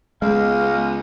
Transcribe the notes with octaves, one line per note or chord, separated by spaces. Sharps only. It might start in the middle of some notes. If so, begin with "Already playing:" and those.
C#2 G#3 B3 D#5 F5